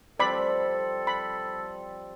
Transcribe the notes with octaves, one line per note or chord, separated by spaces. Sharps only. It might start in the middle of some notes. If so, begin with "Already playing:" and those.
F3 G3 C4 A4 D5 B5
B5